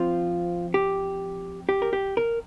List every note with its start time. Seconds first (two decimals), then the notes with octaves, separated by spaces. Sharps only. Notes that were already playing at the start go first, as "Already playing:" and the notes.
Already playing: F3 C4 F4
0.74 G4
1.69 G4
1.82 A#4
1.93 G4
2.17 A#4